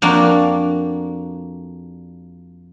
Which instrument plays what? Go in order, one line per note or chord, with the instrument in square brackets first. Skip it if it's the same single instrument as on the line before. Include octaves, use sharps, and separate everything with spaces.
[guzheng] F2 A#3 D4 F#4